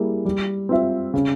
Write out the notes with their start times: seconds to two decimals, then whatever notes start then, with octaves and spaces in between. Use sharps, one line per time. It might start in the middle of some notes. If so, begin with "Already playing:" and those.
Already playing: G3 A#3 E4 G#4
0.25 G3
0.69 C4 F4 C5 E5
1.14 C#3